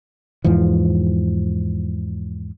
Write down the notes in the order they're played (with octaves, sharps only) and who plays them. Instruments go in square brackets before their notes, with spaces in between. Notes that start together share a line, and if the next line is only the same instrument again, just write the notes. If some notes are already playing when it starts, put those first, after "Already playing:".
[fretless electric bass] E2 G#2 E3 F3